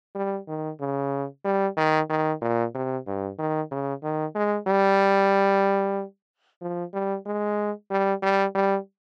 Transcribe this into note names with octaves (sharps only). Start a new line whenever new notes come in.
G3
D#3
C#3
G3
D#3
D#3
A#2
C3
G2
D#3
C#3
D#3
G#3
G3
F3
G3
G#3
G3
G3
G3